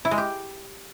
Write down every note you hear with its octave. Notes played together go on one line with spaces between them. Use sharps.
E4
G#3
G4